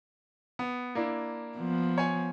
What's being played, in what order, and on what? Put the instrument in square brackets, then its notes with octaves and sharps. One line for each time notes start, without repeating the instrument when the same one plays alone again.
[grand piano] B3
A#3 D4 E4
[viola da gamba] F3 B3
[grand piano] C#5 G#5